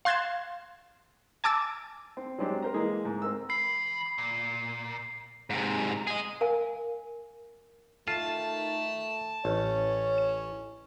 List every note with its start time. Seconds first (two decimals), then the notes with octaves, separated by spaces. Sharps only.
0.05 F5 C6 F#6 G#6 A6 E7
1.44 G#5 A5 D6 E6 A6
2.17 C4
2.38 F#3 G#3 C4 D4 G4
2.62 A#4 C5 A#5
2.74 E3 G#3 A#3 G#4
3.05 G#2
3.22 C4 A#4 E6
3.50 E3 B5 C7
4.18 A#2
5.50 G#2 C3
6.07 G#4 D#5
6.41 A#4 F5 G#5
8.08 D#3 A3 F4 A5
9.45 A1 C#4 C#5